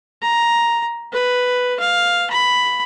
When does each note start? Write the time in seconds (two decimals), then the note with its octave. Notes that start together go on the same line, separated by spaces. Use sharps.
0.22 A#5
1.13 B4
1.80 F5
2.30 B5